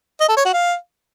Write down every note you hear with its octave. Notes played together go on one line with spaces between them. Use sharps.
D#5
A4
C#5
F#4
F5